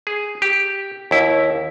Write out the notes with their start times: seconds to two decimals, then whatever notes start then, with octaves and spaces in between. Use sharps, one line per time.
0.07 G#4
0.42 G4
1.11 D#2 E4